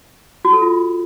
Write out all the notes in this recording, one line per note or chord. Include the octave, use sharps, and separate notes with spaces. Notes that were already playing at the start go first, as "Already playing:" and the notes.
F#4
A4
F4